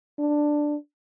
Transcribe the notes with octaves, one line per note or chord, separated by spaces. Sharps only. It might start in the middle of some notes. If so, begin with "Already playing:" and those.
D4